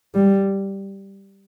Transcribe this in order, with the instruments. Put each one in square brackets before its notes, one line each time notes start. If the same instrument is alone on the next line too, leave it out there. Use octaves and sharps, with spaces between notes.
[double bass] G3